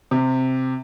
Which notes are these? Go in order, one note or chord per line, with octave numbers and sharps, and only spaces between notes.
C3